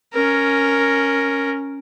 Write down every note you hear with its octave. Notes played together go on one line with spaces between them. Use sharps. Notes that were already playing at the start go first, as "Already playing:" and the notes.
C#4 A#4